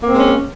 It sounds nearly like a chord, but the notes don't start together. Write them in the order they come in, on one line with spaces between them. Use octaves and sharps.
A#3 C4 G#3 C#4